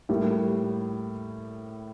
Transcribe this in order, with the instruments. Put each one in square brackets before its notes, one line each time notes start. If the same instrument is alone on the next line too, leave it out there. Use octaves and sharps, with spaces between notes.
[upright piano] A2 G3 A#3